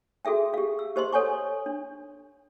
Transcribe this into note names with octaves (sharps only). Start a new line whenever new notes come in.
F#4 G#4 A4 E5 G5
G4 F5
E6
G4 C5 D#5 C6
A4 C#5 F#5 G#5 C#6
D4